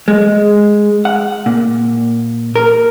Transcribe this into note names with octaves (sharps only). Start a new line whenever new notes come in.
G#3
F#5
A#2
A#4